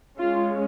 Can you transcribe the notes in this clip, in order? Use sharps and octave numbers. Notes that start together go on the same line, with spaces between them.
G#3 C#4 F4